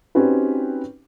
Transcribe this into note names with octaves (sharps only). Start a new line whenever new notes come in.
C4 C#4 D#4 F#4 G4 B4